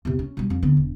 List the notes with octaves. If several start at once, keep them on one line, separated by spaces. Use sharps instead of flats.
E2 C3
C#4
B2 G3
F2
D3 B3
E1